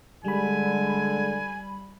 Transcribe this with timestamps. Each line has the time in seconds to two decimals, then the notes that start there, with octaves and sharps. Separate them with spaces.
0.25 D3 G3 G#3 G#5 B5